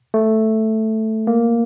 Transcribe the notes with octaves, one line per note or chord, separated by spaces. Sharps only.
A3
A#3